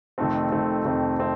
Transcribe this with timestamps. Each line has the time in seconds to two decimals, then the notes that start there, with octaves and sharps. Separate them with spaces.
0.18 F1 F2 D#3 A3 C4
0.52 F1 F2 D#3 A3 C4
0.85 F1 F2 D#3 A3 C4
1.20 A3 C4